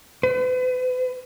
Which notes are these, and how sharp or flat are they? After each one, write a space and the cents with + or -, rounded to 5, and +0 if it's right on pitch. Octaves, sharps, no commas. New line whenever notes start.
B4 +40